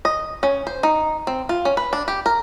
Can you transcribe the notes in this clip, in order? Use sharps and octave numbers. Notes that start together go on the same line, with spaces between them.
D#5
C#4
C5
D#4
C4
F4
C#4
B4
D4
G4
A#4